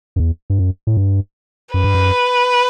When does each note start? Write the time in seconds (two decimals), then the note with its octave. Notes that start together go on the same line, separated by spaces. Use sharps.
0.16 F#2
0.20 E2
0.50 G2
0.59 F#2
0.87 A2
0.97 G2
1.74 F#2 B4
1.84 G2
1.95 F#2